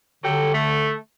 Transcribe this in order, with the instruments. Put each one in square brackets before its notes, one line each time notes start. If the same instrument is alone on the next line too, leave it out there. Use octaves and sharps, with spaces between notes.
[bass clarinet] D3 [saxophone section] F#3 G4 A4
[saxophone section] A3